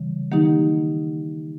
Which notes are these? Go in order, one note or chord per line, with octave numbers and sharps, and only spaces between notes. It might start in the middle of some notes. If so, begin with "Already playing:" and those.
Already playing: C#3 E3 G3
D#3 F#3 A#3 D#4 G4